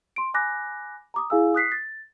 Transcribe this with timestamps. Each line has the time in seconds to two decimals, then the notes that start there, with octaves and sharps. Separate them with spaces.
0.16 C6 D7
0.34 G#5 B5 D6 F#6 A#6
1.14 A#5 D6 D#6
1.30 E4 G#4 F5 G#5 E6
1.54 D#6 F#6 B6 C7
1.72 A6